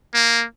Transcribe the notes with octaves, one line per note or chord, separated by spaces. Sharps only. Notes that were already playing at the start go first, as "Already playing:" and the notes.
A#3